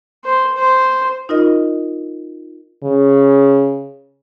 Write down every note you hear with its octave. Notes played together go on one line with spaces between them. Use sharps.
C5
C5
D#4 F4 A#4 D#5
C#3